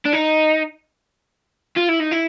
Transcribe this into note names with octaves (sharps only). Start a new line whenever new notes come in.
D4
D#4
F4
E4
D#4
E4